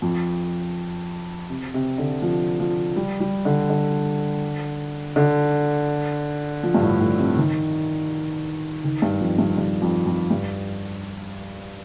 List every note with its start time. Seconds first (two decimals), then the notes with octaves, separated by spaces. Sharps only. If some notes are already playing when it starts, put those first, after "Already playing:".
0.02 F2
1.50 C3
1.74 C3
1.98 D3
2.22 F3
2.60 F3
2.96 G3
3.20 G3
3.45 D3
3.70 D3
5.16 D3
6.63 F3
6.74 G2
6.82 A2
7.00 A2
7.19 C3
7.37 D#3
8.84 D#3
9.02 G2
9.21 F2
9.38 G2
9.57 G2
9.82 F2
10.06 F2
10.31 G2